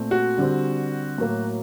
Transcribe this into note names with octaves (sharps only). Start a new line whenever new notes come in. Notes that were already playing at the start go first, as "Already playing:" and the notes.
Already playing: A#2 A3 C4
F#4
D3 G3 C4
A2 F#3 A#3